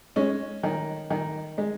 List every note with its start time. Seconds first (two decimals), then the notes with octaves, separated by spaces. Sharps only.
0.16 G#3 C#4
0.63 D#3
1.10 D#3
1.58 G#3